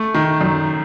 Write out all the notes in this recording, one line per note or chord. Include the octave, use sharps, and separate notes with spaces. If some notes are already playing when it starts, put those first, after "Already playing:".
Already playing: A3
D#3
F#2